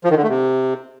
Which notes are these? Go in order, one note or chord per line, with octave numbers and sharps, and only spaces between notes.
F3
D#3
D3
A3
C3